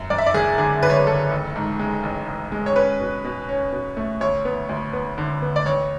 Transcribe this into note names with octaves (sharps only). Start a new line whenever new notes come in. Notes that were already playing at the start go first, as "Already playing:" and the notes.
Already playing: F#2
F#2 D5
E5
D5
F#1 G#4
D3 G#4
D3 B4
C#5
B4
F#1 A4
A1
G#2
G#3
A1
A1
G#3
C#5
C#4 B4
B2
B2
C#4
B2
A3
D2 C#5
B3
D2
B3
D3
B3
D5
A1 C#5